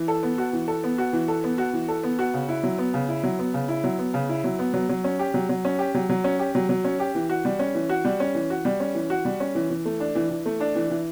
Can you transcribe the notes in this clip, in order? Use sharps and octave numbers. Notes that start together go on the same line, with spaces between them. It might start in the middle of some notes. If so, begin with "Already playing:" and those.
Already playing: E3
A4
B3
F#4
E3
A4
B3
F#4
E3
A4
B3
F#4
E3
A4
B3
F#4
C#3
E4
F#3
B3
C#3
E4
F#3
B3
C#3
E4
F#3
B3
C#3
E4
F#3
B3
F#3
F#3
C#4
G4
F#3
F#3
C#4
G4
F#3
F#3
C#4
G4
F#3
F#3
C#4
G4
E3
F#4
G3
C#4
E3
F#4
G3
C#4
E3
F#4
G3
C#4
E3
F#4
G3
C#4
E3
E3
A3
D4
E3
E3
A3
D4
E3
E3